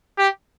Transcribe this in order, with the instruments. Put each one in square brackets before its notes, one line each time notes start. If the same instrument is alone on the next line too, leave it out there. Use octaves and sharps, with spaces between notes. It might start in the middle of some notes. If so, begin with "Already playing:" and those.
[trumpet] G4